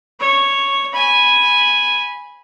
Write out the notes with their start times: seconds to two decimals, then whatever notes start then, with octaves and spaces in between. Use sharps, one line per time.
0.20 C#5
0.93 G#5 B5